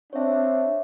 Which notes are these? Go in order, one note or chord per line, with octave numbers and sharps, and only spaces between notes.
C4 D4 C#5 E5